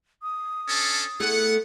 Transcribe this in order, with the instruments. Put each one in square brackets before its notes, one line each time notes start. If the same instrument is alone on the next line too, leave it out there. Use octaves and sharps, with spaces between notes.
[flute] D#6
[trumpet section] C#4 D4 A4
[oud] A3 E4 G#4 [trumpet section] B3 F#5